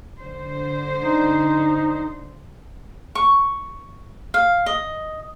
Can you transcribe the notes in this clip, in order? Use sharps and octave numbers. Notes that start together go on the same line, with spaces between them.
D3 C5
D#4
C#6
F5
D#5